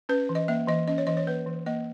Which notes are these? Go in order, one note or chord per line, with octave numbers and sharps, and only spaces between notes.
C#4 B4
E3
D#5
A#3 E5
E3 D#5
C#4 D#5
C#5
E3 D#5
C#5
A#3 B4
E3
A#3 D#5